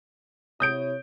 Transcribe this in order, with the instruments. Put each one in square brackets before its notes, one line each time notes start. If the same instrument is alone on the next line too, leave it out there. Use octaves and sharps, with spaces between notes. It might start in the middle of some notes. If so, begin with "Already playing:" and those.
[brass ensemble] C3 E4 C#5 [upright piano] D#6 G6 D7